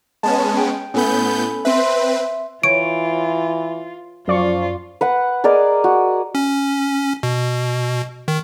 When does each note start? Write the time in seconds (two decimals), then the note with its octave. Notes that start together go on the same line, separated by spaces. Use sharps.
0.23 G#3 B3 C#4 A5
0.57 G5
0.94 A2 B3 C#4 A4 B5 G6
1.65 C4 B4 E5 C6
2.63 E3 F4 C#5 D7
4.28 F#2 F3 F4 D5 C#6
5.01 B4 F#5
5.44 G#4 A#4 D5 D#5
5.84 F#4
6.35 C#4
7.23 B2
8.28 D#3